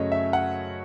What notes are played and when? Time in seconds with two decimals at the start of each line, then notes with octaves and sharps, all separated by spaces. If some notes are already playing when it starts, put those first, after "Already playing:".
Already playing: F#2 C#3 F#3 A3 C#5 D#5
0.12 E5
0.33 F#5